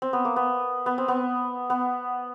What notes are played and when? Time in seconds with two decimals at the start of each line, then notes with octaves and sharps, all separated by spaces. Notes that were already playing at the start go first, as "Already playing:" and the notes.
0.02 C4
0.13 B3
0.25 A#3
0.36 B3
0.86 B3
0.98 C4
1.08 B3
1.70 B3